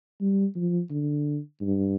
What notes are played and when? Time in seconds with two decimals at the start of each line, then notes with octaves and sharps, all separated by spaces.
0.21 G3
0.56 F3
0.90 D3
1.61 G2